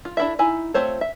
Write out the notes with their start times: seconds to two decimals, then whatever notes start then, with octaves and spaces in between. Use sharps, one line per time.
0.05 F4
0.17 D4 E4 A4 E5
0.39 D#4 E4 G#5
0.74 A3 C4 F4 C5 C#5
1.01 E5